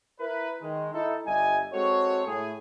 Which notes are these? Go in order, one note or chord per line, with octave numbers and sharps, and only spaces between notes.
E4 A#4 B4
D#3 G#3
D#4 E4 A4
G1 G3 D#5 E5 G#5
G#3 C4 F#4 A4 C5 C#5
A2 G#4